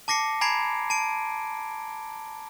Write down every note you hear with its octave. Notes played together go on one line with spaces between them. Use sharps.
A5 D6 A#6 C7 C#7
G#5 A#5 B5 G#6 C7 D7
A5 D7